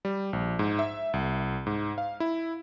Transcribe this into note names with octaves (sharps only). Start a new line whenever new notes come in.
G3
A#1
G#2
E5
C2
G#2
F5
E4